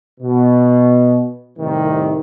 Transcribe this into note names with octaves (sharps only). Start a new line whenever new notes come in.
B2
C2 A2 C3 D#3